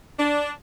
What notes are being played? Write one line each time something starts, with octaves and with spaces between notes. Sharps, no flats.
D4